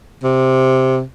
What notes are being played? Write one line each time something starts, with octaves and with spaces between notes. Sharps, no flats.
C3